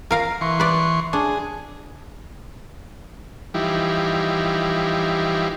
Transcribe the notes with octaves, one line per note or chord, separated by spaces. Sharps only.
A#4 F5 A#5
E3 C6 C#6
B4 D5
D4 G#4
E3 F3 G3 D#4 E4 G4